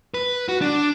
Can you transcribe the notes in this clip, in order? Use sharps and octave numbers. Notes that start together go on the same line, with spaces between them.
B4
F#4
D4